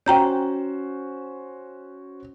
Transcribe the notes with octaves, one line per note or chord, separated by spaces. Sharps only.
C#4 F#4 C5 G5 A#5 G6